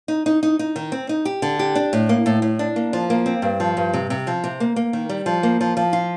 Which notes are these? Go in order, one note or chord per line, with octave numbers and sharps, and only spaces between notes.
D#4
D#4
D#4
D#4
D#3
C4
D#4
G4
D3
G4
D4
A2
A#3
A2
A2
D4
A#3
F3
A#3
C4
G2
F3
G2
C3
C3
F3
C3
A#3
A#3
D#3
G3
F3
A#3
F3
F3
F4